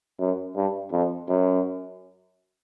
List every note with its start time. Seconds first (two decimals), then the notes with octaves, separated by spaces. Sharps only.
0.20 F#2
0.56 G2
0.92 F2
1.29 F#2